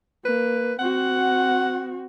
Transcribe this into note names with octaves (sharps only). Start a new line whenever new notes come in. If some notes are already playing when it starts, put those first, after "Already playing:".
A#3 B4
C4 F#4 F#5